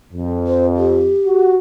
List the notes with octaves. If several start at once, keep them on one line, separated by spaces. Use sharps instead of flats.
F2
C5
G4
F#4